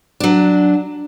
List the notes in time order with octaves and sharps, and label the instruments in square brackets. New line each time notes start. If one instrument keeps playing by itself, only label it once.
[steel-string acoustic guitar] F#3 D4